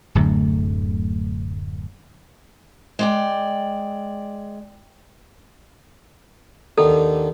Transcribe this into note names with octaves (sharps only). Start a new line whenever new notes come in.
D1 F#2 D3 A3
G#3 D5 G5
D#2 D3 D#3 A4